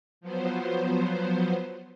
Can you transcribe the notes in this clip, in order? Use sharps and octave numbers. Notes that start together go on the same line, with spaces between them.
F3 F#3 B3 C5